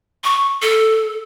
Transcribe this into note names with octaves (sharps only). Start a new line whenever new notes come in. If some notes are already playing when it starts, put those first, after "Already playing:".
C#6
A4